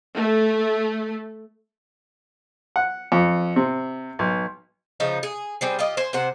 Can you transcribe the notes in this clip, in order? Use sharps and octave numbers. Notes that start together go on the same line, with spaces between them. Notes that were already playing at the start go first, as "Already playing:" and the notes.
A3
F#5
F2
C3
B1
C#3 F3 D#4
G#4
G3 C4 G#4
F4 G4 D#5
C5 G#5
C3 C5 F#5